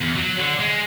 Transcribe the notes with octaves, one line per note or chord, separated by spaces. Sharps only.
E2
F#3
D3
G#3